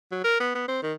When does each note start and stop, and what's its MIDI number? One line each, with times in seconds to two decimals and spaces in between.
0.12 0.21 54
0.24 0.36 70
0.40 0.51 59
0.55 0.68 59
0.68 0.80 60
0.83 0.93 51